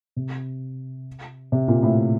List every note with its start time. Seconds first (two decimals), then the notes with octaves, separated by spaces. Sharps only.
0.16 C3
1.52 C3
1.68 A#2
1.83 A2